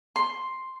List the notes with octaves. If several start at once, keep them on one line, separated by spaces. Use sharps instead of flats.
C6